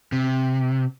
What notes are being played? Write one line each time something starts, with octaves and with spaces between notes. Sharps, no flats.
C3